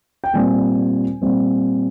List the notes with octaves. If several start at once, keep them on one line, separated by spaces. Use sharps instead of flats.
G5
A#2 G3 C4 G#5
A#2 G3 C4